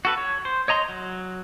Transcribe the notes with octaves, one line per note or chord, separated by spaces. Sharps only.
F#4 A4 B4
C#5
C5
C#5 D#5 A#5 C6
F#3